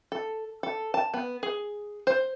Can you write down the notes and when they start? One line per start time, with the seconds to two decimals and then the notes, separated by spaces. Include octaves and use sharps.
0.12 A4
0.63 A4
0.94 A5
1.14 B3
1.43 G#4
2.07 C5